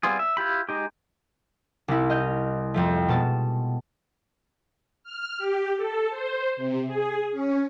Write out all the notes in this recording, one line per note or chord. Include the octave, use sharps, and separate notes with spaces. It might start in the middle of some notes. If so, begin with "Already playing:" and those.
G3 B3 C4 F4 G#4
E5
E4 F4 G4 B5
G#3 D#4 G4
C2 E4
D#5 F6 G6
F2 F3 A3
B2 G#3 A5
F6
G4
A4
C5
C3
G#4
C#4